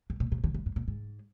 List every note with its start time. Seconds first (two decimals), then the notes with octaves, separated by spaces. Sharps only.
0.10 G#2
0.20 A#2
0.32 A#2
0.44 D3
0.54 G2
0.66 G#2
0.76 A#2
0.88 G#2